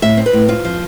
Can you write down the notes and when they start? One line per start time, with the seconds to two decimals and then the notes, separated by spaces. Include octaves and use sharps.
0.02 A2 E5
0.17 C4
0.26 B4
0.33 A2
0.48 C4 F4
0.65 F3